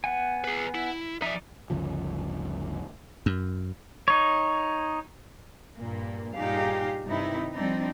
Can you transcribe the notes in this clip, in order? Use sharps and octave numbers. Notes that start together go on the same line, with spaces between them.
B3 F#5 G#5
G#4 B4
E4
F3 D#4 D5 E5
G1 D2 C#3 F3
F#2
D#4 C#5
G2 A#2 A#3
G2 A#2 D#4 G4 G#4 F5
G2 C3 D#3 D#4 E4
F3 G3 C4 D4 D#4